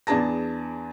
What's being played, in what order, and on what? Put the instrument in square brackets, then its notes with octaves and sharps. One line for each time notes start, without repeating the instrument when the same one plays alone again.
[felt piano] E2 B3 D4 G#4 A5 A#6